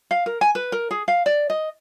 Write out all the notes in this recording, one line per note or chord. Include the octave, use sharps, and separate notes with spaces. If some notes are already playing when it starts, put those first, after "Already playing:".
F5
A#4
G#5
B4
A#4
G#4
F5
D5
D#5